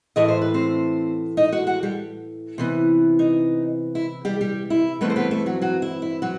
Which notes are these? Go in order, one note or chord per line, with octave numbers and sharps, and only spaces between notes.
A2 E3 A3 D#5
C5
B4
C4 C5
D#4 D#5
F#4 F#5
F#4 F#5
G3 G4
C3 E3 B3
D#4
E4
G3 G4
G3 G4
E4
G2 E3 A3 B3 C4 B4
C5
B3 B4
A3 A4
F#3 F#4
F#3 F#4
E4
E4
F#3 F#4